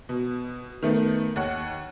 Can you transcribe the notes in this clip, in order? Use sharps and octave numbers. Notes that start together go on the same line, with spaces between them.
B2
D#3 A3 B3
D#2 C#5 F#5